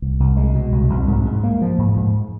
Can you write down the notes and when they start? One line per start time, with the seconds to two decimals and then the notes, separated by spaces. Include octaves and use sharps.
0.02 C2
0.20 C2
0.37 G#3
0.55 B2
0.72 C2
0.90 C2
1.08 G#2
1.26 G#2
1.43 A#3
1.61 F3
1.78 G#2
1.97 G#2